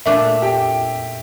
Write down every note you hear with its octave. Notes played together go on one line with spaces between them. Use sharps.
A#2 A3 D4 E5
G4 G5